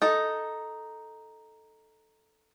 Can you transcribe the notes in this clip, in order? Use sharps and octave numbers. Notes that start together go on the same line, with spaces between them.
D#4 A4